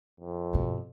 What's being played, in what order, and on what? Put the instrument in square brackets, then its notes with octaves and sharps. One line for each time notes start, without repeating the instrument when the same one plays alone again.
[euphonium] F2
[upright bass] G2 B2